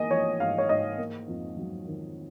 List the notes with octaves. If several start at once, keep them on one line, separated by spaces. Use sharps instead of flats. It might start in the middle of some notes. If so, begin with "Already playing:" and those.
Already playing: G#2 A#3 D#5 G#5
F3 C#5
G#2 F5
C#5
G#2 D#5
A#3
F2
F#3
D#3